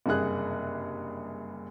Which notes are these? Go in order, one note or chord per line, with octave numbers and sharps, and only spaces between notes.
F#1 G2 C3 G#4 F#6